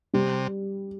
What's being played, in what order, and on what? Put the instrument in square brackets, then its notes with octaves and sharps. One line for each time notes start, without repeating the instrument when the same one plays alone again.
[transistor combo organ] C3 [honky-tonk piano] G3